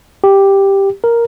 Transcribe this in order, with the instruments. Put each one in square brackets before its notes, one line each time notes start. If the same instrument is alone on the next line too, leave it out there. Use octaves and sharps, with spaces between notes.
[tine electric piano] G4
A#4